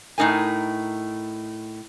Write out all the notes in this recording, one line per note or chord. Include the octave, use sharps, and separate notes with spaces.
A2 C4 D#4 A#4 G#5